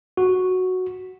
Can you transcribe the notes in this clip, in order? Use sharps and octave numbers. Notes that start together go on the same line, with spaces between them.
F#4